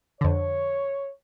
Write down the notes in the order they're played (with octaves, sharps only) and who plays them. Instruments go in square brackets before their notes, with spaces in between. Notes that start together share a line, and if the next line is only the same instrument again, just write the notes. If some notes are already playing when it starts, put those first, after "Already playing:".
[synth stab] F2 D3 [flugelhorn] C#5